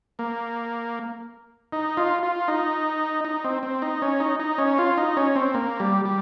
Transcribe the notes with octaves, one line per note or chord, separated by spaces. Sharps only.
A#3
D#4
F4
F4
D#4
D#4
C4
C4
D#4
C#4
D#4
D#4
C#4
F4
D#4
C#4
C4
A#3
G3
G3